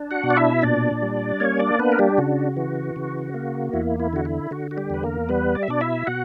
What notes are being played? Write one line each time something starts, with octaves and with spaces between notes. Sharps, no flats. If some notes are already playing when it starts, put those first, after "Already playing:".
Already playing: D4
F#4 F#5
B2
D5
E4 E5
A#2 D4 D5
G3
A#3 C#4 C#5
D4 D5
B3 D4 B4
A#4
G3 G4
C#3 F#4
E3
C#3
A#3
E2 E4
E4
D3 F#4
E4
D3 F#4
F#4
G3 G4
E2 B4
A#3 A#4
G3 B3 B4
D5
E5
B2 D4 D5
E4 E5
B2 F#4 F#5